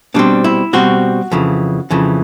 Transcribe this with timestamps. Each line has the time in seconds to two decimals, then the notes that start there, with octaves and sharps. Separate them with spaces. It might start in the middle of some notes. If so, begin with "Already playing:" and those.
0.14 B2 G3 C4 D4
0.44 E4
0.73 B2 G3 C4 F#4
1.32 F2 C#3 E3
1.91 F2 C#3 E3